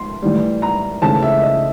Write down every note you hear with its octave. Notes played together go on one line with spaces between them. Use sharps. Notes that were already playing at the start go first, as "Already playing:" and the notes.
Already playing: C6
A2 E3 G3
A#5
C#3 E3 A3 C4 A5
E5
D#5